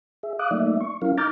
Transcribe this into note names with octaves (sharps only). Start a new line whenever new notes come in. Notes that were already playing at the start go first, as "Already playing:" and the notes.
G#4 E5
F5 D6 D#6 F#6
F#3 A3 A#3 D#4 D5 E5
C#6
F#3 C#4 E4 A#4 F5
D#4 A#5 D6 F6 G6 A6